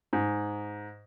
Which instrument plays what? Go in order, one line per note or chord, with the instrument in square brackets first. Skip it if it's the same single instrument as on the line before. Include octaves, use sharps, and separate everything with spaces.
[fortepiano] G#2